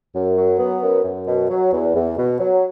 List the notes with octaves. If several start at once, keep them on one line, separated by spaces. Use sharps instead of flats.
F#2
F#3
B3
F#2
F#2
B2
F#3
E2
E2
B2
F#3